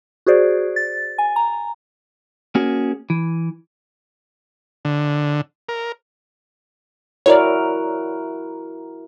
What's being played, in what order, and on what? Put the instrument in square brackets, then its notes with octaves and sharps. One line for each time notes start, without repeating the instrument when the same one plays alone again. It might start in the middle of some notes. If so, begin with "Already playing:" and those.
[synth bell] F#4 G#4 C5 D5
A6
G#5
A#5
[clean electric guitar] A#3 C#4 F#4 G#4
E3
[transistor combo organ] D3
A#4
[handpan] E4 F#4 A#4 [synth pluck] C#5 D5